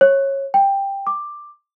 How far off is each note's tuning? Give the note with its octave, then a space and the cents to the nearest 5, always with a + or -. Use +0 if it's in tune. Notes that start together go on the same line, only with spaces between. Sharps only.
C#5 -20
G5 +10
D6 +10